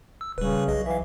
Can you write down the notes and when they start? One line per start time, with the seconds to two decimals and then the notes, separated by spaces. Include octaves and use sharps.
0.21 E6
0.38 D#1 C#3 G3 B4
0.68 B1 G#4 D#5
0.86 E3 E5 F5